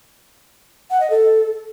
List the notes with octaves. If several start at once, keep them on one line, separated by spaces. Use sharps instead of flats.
F#5
D#5
A4